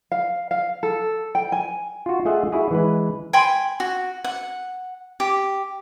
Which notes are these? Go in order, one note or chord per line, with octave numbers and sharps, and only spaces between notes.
F5
F5
A4
G5
G#5
F4 F#4
A3 F4 G#4 D#5 E5 F#5
E4 F#4 G#4
E3 G#3 B4
G5 G#5 B5 C6
F#4
F#5
G4